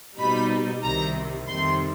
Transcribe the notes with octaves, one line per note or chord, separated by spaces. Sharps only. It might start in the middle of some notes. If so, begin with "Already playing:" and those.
B2 G3 C4 D#4 B5
C2 C3 D#3 G3 C4 A#5
F2 C3 D#3 G3 C4 C6